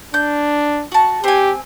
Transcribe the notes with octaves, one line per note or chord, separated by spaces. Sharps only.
D4 G6
F#4 A5
C4 G4 G#5